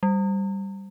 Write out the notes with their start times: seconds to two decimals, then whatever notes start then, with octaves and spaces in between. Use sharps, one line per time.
0.03 G3